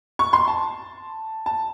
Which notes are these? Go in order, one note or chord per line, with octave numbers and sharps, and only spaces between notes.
C#6
C6
A5
A5